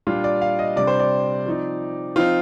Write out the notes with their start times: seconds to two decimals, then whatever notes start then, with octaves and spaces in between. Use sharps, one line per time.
0.07 A#2 G3 D4 F4
0.24 D5
0.42 F5
0.59 D#5
0.76 C3 G3 D4 D5
0.87 C5
1.00 D5
1.46 F3 C4 D#4
2.16 F3 C4 D#4 F4